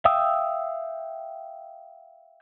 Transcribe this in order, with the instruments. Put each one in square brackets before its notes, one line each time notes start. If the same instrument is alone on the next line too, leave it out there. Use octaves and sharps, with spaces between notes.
[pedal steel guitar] E5 F5 G5 D#6 E6